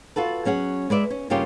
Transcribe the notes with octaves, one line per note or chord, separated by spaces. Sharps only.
F4 F#4 A4 B4
F#3 C#4 G#4 F#5
G#3 B4 D5 E5
C#4
G2 C#3 A#3 C#4 F4 G4